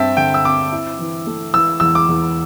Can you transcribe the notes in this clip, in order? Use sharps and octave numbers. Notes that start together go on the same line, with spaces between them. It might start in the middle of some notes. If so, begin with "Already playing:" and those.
Already playing: G2 C4 E5 G5 A5
D3 G5
E6
C4 D6
E4
E3
A3
E3 E6
E2 E6
D6
E2